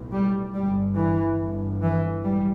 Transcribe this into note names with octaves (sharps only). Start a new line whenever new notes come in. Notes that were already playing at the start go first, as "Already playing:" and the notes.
Already playing: B1 A2
G3
G1 G2 G3
E3
G1 G2
E3
A1 G3